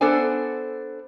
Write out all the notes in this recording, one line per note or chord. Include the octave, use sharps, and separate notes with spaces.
B3 D4 A4 C5 D5 G#5